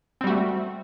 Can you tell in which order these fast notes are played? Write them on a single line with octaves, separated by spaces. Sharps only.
C4 G3 F#4 A3